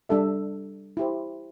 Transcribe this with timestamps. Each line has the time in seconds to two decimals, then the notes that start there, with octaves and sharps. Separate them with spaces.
0.09 G3 D4 A4 E5
0.97 E4 G4 C5